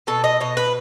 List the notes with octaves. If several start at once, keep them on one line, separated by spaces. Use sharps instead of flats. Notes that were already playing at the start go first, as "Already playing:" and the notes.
B2 A4
D#5
B2 D#5
B4